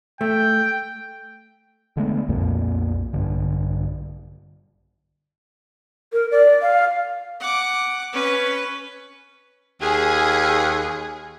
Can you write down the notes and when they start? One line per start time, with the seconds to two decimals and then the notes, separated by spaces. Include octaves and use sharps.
0.21 A3 G5
1.97 D3 G#3 A3 B3
2.28 B1 F2 A#2 A#3
3.13 A#1 G2 D3
6.13 A#4
6.31 D5
6.62 F5
7.40 F#5 D6
8.13 C#4 B4
9.82 D#2 G#4